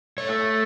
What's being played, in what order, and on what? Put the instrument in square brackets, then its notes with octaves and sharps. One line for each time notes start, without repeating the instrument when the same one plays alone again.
[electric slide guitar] A3 C#5